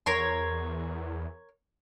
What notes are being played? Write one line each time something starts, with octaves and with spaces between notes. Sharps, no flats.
E2 A#4 C#5 C6